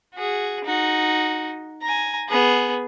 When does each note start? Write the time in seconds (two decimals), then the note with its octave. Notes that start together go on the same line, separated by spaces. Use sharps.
0.15 F#4 G#4
0.64 D#4 F#4
1.82 G#5 A#5
2.29 B3 G#4